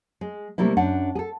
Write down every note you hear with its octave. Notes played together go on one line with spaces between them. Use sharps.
G#3
C3 G3 A3 A#3 E4
F#2 D4 F#5
G#4 A4